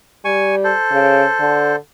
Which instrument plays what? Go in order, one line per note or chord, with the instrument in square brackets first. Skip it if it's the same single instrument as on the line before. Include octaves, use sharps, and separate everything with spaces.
[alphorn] G3 [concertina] G#5 C#6
[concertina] A4 C5
[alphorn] C#3
D3